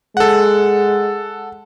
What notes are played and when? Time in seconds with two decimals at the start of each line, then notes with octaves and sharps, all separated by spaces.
0.17 G#3 A4 F#5